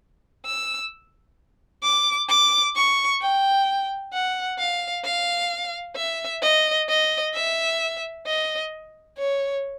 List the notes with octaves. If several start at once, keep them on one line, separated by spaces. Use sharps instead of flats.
E6
D6
D6
C#6
G5
F#5
F5
F5
E5
D#5
D#5
E5
D#5
C#5